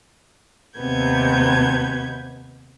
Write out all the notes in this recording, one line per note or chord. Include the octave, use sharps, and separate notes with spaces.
D#2 C3 B3 G6 G#6